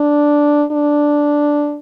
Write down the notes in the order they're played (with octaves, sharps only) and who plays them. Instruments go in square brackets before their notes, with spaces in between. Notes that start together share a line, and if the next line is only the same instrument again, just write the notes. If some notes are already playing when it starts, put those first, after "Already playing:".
Already playing: [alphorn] D4
D4